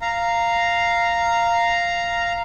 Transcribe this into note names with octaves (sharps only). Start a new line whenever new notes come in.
F5 A#5